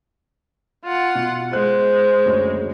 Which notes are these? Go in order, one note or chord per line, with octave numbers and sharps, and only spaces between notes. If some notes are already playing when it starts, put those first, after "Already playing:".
F4 F#5
B2
G#3 C5 F#6
F#1 D2 C#5